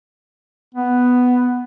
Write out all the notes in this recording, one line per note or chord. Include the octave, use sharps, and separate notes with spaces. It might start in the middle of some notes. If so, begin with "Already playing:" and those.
B3